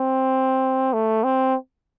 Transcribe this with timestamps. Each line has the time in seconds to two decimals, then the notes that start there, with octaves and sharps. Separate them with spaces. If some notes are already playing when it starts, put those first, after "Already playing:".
Already playing: C4
0.93 A3
1.24 C4